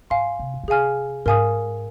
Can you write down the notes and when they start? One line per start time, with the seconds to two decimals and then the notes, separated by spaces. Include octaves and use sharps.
0.10 G#2 F5 G#5 C6
0.39 C3
0.54 A#2
0.63 D#3
0.68 C3 G#4 F5 G#5 F6
1.26 G#2 A#4 F5 G#5 D#6